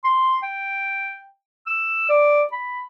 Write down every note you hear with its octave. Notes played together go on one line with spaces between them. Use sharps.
C6
G5
E6
D5
B5